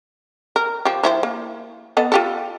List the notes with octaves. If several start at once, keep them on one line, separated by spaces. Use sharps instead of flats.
A#4
F3 G4
F3 E4 C5
A#3
B3 A4 D#5
F4 G4 A4